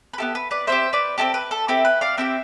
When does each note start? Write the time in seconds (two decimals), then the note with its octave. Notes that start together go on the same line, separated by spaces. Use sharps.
0.13 B4
0.18 B3 E4 G4 A4
0.35 B4
0.51 B4 D5
0.67 C4 E4 G4 C5 E5
0.93 B4 D5
1.18 C4 E4 G4 A4
1.34 B4
1.51 A4
1.68 C4 E4 G4 A4
1.85 B4
2.01 D5 F5
2.17 C4 E4 G4 E5 G5